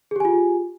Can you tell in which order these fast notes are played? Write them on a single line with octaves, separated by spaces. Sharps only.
G#4 G4 G#5 F4